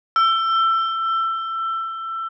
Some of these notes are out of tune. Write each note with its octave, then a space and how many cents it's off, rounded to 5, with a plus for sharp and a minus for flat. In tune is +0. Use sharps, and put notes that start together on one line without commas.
E6 +25